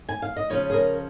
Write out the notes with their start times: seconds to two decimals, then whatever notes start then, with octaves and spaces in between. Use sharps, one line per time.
0.09 G#5
0.22 F5
0.36 D#5
0.50 C#3 F3 C#4 F4 C#5
0.70 G#4
0.73 A#4